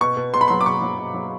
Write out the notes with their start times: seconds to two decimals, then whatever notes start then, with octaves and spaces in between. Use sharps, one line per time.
0.01 B2 C#6
0.17 B2
0.34 B2 C6
0.41 B5
0.48 F#3 C6
0.61 D6
0.66 B2 C#6
0.82 F#3
0.98 B2
1.14 F#3